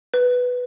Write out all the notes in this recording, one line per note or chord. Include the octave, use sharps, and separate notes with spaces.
B4